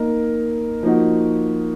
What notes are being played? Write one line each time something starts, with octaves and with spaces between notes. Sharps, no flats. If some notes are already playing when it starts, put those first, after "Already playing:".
Already playing: A#3 D#4 A#4
F3 A#3 D#4 F#4